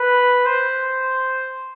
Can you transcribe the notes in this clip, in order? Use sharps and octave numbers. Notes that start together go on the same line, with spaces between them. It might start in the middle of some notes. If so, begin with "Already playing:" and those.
Already playing: B4
C5